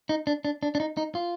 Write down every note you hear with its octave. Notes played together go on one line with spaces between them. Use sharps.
D#4
D4
D4
D4
D4
D#4
D#4
F4